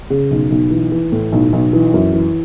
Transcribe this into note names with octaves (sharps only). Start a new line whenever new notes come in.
C#3
B1
B1
E3
E3
A2
B1
B1
E3
F#2
E3